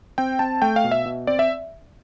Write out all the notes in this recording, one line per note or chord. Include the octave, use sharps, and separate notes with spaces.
C4 G5
C4 A5
A3 G5
F5
B2
E5
B2
C4 D5
E5